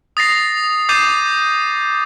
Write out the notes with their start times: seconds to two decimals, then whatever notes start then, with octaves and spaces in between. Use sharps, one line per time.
0.17 D#6 A6 A#6 C7 F7
0.89 D6 D#6 G6 A6 C7 D#7